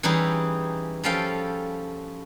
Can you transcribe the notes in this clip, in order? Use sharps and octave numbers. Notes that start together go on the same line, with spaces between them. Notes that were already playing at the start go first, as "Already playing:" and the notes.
E3 G3 C#4 D#4 G4 G#4
F3 G3 C#4 A4 F5 G5